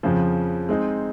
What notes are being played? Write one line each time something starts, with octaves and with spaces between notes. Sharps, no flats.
F2 C#3 F3
G#3 C4 D#4